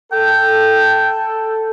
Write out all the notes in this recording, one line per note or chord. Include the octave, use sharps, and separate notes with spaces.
A4 G5